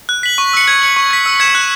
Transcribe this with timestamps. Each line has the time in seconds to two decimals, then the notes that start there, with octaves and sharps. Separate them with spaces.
0.09 F#6
0.23 B6 F#7
0.38 C#6
0.53 E6 C#7
0.68 G#6
0.82 C#7 F#7
0.96 C#6
1.11 G#6 B6
1.26 E6
1.40 G#6 C#7 E7
1.55 F#6